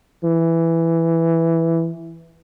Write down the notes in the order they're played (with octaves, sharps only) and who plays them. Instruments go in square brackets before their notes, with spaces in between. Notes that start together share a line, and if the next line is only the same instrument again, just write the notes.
[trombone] E3